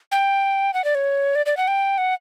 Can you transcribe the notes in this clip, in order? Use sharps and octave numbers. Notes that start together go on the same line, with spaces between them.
G5
F#5
D5
C#5
D5
D5
F#5
G5
F#5